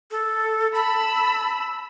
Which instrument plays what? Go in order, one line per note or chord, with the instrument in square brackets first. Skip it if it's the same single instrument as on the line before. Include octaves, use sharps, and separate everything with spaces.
[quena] A4
[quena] A5 [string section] B5 E6